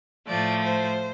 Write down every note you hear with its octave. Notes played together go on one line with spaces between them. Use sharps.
A2 F3 A3 D5
C5